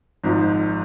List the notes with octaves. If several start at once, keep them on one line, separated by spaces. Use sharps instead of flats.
G#1 G#2 F3